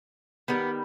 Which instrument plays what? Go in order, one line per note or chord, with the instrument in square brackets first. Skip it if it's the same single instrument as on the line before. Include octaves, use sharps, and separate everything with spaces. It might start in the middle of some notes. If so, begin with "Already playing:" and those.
[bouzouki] D#3 G3 [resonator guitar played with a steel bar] B3